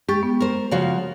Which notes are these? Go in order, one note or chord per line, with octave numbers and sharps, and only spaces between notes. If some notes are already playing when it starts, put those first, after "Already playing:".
G#3 G4 C#6 A6
B3
A#4 C5
C#3 F3 F#4